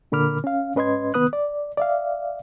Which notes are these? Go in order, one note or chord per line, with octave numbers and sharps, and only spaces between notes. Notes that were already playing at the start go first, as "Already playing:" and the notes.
A#2 D3 A#4 B5 D6 F6
C#4 F5
G#2 C#4 B4 D#5 C6 G#6
C2 D#3 B3 B4 D#6 F#6
D5
D5 E5 F5